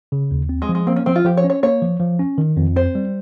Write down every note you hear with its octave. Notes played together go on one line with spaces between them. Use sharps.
C#3
D#2
C4
G#3
F3
G#3
A#3 C4
C#4
F3 C4
F4
F3 G4
C#5
C#4
C#5
A#3 C#5
F3
F3
C#4
D#3
F2
C4 C5
G3